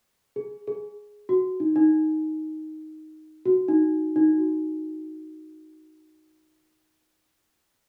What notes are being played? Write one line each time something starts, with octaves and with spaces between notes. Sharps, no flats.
G#4
G#4
F#4
D#4
D#4
F#4
D#4
D#4
F#4